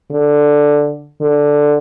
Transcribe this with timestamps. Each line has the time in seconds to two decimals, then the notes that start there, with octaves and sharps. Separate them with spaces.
0.11 D3
1.22 D3